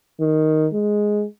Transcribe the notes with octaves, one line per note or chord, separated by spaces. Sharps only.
D#3
G#3